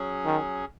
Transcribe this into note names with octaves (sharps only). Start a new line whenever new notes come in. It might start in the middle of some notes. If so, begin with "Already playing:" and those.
Already playing: F#3 C#4 G#4
D#3